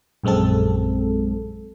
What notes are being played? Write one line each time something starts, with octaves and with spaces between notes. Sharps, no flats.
A#1 F#2 G#3 C4 A4